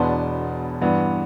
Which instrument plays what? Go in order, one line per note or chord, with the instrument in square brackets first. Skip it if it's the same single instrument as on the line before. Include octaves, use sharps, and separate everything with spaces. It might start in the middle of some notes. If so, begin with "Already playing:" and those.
Already playing: [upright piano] E1 E2 B2 B3 D4 A5 C6
G2 E3 B3 D4